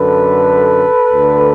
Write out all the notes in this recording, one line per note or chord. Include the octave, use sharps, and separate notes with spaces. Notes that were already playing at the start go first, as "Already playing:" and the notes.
Already playing: F#2 D3 A4 B4
D2 D3